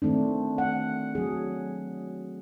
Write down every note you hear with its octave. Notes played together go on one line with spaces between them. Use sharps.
D#3 A3 C4 D4
F#5
F#3 G#4